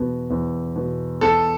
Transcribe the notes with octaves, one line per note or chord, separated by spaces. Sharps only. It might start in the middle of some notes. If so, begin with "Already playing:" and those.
Already playing: E2 B2
E2
B2
E2 A4